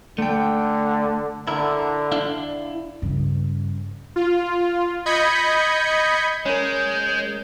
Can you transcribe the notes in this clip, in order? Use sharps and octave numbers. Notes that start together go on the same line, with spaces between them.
D3 A3 G5
D3 E4 A#4
D4 E4 F5
G2 C#3
F4
D#5 B5 G6 G#6 B6 C#7
G#3 C#4 A#4 C#5 G6